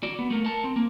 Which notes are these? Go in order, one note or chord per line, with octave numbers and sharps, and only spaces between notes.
F#4 D5
B3
A3 A#4
A#4 A5
C4
A#3